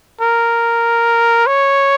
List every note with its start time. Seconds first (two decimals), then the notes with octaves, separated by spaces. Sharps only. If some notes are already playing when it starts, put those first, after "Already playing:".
0.21 A#4
1.47 C#5